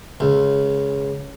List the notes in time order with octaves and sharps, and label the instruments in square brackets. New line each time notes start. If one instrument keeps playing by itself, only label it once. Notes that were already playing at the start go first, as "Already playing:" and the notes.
[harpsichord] C#2